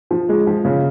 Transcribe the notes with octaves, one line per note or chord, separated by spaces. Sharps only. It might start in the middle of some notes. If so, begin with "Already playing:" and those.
F3
G#3
F3
C#3